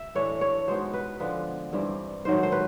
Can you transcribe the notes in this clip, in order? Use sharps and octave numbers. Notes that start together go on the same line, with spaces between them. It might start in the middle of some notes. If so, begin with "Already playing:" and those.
Already playing: E5
A2 E3 A3 D4 C#5
C#5
B2 G#3 B3 D#4 C5
B4
D3 F3 G#3 B3 B4
G2 E3 G3 C4
G#2 D#3 F#3 A3 C5
C5
B4